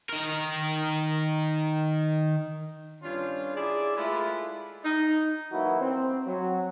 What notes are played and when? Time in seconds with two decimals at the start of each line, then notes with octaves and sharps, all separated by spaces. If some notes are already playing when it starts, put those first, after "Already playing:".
0.09 D#3 A#4
3.02 G2 C#4 D4 F4
3.55 E4 G#4 D5
3.96 G#3 A3 E4 F4 B4
4.84 D#4
5.52 E3 F#3 A#3 D#4 E4 F#4
5.81 C4
6.26 F#3